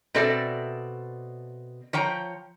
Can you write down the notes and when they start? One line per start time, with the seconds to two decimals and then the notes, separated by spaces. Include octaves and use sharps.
0.14 B2 C4 A4 D5 E5
1.93 F3 C#5 G5 A#5